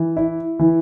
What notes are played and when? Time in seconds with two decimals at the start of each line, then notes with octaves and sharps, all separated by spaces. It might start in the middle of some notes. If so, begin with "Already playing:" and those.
Already playing: E3
0.16 E4
0.59 E3